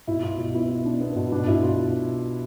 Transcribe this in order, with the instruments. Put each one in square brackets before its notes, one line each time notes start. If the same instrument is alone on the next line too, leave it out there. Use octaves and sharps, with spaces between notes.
[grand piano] B2 [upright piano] E4
[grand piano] B2 [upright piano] F4
[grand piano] B2
[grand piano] B3 [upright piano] E4
[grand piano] B3
D4
B3
B2
[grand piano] B2 [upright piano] D4
[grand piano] B2 [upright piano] E4
[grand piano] B2 [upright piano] F4